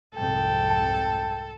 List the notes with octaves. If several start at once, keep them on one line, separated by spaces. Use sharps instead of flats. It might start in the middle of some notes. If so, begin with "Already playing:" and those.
C2 F2 G#2 A4 G5
A5